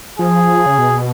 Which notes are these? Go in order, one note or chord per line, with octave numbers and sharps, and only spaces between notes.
F3 G#4
C#3
B2